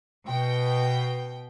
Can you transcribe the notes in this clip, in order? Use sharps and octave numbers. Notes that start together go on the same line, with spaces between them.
B2 G5